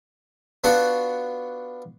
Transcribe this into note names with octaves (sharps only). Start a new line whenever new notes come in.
B3 D4 F4 F#4 F#5